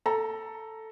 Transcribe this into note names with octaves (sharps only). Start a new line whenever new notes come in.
A4 A#5